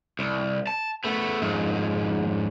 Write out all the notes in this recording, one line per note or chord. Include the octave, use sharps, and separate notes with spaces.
C2
A5
A3 B3
F2 G#2